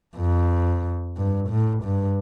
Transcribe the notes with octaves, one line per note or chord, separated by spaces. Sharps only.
F2
G2
A2
G2